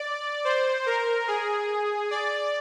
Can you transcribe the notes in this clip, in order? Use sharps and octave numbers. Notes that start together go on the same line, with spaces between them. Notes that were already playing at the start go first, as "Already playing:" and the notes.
Already playing: D5
C5
A#4
G#4
D5